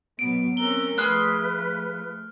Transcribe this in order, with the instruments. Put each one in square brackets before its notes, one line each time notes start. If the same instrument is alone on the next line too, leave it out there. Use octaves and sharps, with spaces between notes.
[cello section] B2 F#3 B3 [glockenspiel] D7
[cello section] C4 C#4 A#4 [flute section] A#5 E6 F#6 [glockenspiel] G7
[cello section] F3 A3 [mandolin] G#4 C6 F#6 [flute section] B4 [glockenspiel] F6